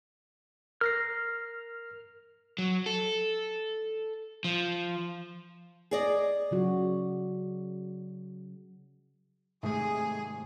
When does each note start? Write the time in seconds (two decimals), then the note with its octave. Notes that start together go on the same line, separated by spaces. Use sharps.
0.81 A#4 F6 A#6 C7
2.58 F#3
2.86 A4
4.44 F3
5.91 G#4 D5 D#5
6.51 C#3 F#3 F#4
9.63 G#2 C3 D#3 A3 G#4